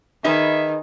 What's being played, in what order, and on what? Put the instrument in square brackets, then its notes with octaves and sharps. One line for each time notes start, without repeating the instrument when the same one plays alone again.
[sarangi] D#3 [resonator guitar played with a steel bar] D#4 G#4 B4 [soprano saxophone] E5